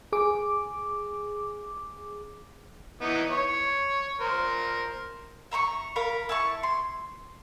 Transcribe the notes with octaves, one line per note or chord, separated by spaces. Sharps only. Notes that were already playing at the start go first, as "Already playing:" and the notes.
G#4 D6
E3 B3 D#4
C#5
A#4 C5
E5 A#5 C6 C#6
A#4 F5 B5
E4 A5 C#6
C6